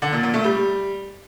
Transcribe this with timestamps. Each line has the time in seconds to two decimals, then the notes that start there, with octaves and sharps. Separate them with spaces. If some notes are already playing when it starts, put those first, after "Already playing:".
0.02 D3
0.13 A#2
0.23 A#2
0.34 A3
0.44 G3